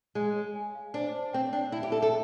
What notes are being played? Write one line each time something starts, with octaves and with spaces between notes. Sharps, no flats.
G#3 G#5
C#5
G#5
F5
D4 C5
C5
C4 G5
D4 G5
E4 E5
G4
A4 E5
A4